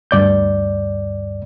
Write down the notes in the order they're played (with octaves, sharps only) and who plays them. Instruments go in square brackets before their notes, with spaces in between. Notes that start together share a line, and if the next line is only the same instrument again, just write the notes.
[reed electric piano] D2 G2 D5 G6